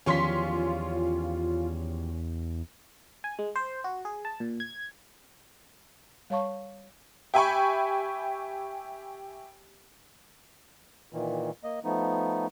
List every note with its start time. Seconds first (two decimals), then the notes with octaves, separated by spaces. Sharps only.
0.06 E2 D#3 F3 G3 C#4 F4 C6 B6
3.24 G#5
3.39 G#3
3.56 C5
3.84 F#4
4.05 G#4
4.25 A5
4.40 A#2
4.60 G#6
6.30 G3 C#5 F5 A5 C#6
7.34 G4 E5 G5 G#5 B5 C#6
11.13 A#2 D#3 E3
11.64 A#3 D#5
11.84 F3 A3 B3 D#4